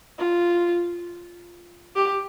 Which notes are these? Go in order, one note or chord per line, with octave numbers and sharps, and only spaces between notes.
F4
G4